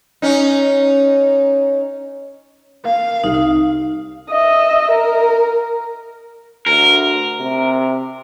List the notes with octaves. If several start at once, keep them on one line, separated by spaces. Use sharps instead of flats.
C#4 D#4
A#3 F5
C2 C3 D#4
D#5 E5
A#4
D2 A#4
C3